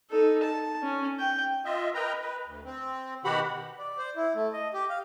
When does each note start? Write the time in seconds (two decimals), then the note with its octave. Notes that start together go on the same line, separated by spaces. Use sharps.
0.10 D#4 A4
0.43 A5
0.83 C#4
1.19 G5
1.65 F4 D#5 E5
1.94 A#4 B4 D#5 G5 A#5
2.21 B4
2.46 D2
2.65 C4
3.25 B2 D#3 F#4 G4 F#5 B5
3.79 D5
3.98 C5
4.16 E4
4.35 A3
4.53 D#5
4.74 G4
4.90 F5